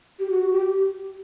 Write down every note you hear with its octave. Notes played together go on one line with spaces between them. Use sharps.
G4
F#4
G4